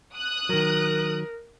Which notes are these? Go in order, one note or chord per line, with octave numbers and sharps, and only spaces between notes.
D#6 F#6
D#3 F#3 A#4